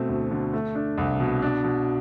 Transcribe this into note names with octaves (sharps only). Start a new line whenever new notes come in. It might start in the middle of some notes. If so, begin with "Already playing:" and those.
Already playing: B2 A3 C4
D2
D3
A3
D4
C2
B2
D4
B2